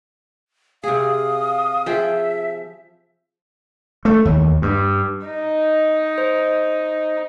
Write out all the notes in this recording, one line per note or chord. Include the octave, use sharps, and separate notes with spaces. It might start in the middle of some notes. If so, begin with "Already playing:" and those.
C3 G#4 F5 D#6
F3 G#4 E5 G5
A3
D#2
G2
D#4
C5